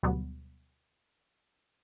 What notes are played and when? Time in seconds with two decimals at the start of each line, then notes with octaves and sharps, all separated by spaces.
0.03 D2 B2 F#3 G3 B3